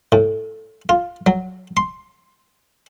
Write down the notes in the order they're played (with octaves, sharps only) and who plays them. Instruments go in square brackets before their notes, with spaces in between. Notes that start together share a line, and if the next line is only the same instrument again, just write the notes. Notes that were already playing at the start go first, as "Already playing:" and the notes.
[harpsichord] A2
F4
F#3
C6